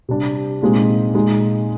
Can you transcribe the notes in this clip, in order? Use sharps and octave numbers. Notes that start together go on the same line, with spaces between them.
C3 G3 D4
A#2 G#3 C4 D#4
A#2 G#3 D#4